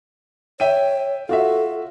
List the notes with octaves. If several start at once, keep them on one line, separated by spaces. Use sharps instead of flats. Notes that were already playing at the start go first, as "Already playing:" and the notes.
C#5 E5 G5 D#7
F4 F#4 A4 E5